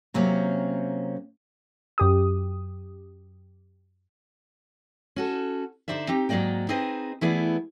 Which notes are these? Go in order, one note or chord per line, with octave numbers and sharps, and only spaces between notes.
C3 F#3 A#3 C4 C#4
F#2 G4 D#6
C#4 F#4 A4
D3 D#4 F#4 C5 D5 E5
C4 D#4 G4
G#2 F#3 A#3 D5 D#5 G5
C4 D#4 G#4 B4 C5 D#5
E3 A3 B3 E4 G#4 D5